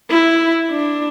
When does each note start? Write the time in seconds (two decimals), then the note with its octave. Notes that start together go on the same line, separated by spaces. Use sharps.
0.10 E4
0.71 D4